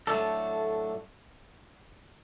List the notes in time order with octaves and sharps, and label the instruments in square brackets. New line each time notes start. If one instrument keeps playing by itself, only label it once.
[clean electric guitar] A2 F#3 A3 D4 A4